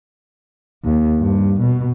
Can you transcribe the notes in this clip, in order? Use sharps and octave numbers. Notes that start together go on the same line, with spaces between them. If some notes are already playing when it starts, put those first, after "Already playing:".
D#2
G2
B2